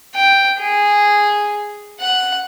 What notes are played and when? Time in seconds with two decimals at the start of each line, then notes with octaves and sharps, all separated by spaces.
0.15 G5
0.60 G#4
2.00 F#5